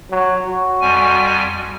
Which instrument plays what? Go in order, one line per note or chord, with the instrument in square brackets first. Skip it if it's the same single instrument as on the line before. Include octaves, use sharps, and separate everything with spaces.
[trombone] F#3
F#4
[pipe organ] F2 G3 G#5